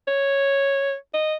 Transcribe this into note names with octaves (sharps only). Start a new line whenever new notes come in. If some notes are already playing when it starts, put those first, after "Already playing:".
C#5
D#5